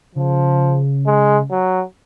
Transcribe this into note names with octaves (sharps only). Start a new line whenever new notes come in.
C#3 F3
G#3
F#3